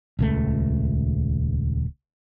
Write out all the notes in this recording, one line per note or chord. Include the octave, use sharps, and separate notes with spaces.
D#1 C#2 A3